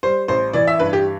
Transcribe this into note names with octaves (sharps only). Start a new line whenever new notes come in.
G3 C5
A1 C5
E3 D5
E5
G2 B4
G4